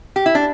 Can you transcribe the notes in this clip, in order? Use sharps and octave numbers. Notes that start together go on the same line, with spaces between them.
G4
E4
D4